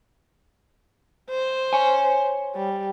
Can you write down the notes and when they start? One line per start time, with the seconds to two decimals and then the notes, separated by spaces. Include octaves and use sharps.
1.31 C5
1.73 C#5 G#5
2.55 G3